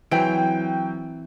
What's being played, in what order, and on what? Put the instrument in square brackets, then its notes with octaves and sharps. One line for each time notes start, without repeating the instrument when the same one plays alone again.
[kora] E3 C4 [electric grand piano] F#3 G5 D7